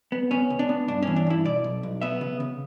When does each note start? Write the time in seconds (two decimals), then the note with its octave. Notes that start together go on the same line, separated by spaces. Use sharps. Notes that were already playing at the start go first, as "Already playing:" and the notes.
0.12 B3
0.31 B3 C#4
0.50 C#2
0.59 D4
0.69 B3
0.88 G2 D4
1.02 E3 C#4
1.16 D4
1.27 G2 E4
1.45 B2 D5
1.64 B1
1.83 B1
2.01 B3 E5
2.21 C#3
2.40 C#3